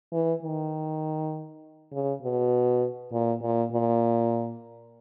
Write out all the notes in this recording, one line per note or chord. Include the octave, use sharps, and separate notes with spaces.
E3
D#3
C#3
B2
A#2
A#2
A#2